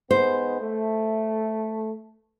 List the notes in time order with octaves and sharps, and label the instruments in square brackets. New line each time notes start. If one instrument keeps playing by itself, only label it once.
[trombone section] G#2 G#3 B3 [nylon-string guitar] C5
[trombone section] A3